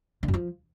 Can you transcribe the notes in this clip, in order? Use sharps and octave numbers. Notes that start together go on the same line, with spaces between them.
D3
F#2
F3